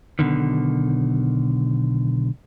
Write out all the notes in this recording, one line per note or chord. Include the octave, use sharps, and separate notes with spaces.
B1 B2 D3 D#3